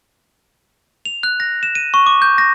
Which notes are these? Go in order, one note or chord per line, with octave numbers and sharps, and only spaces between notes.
F7
F#6
A#6
E7
D#7
C#6
D6
G6
A#6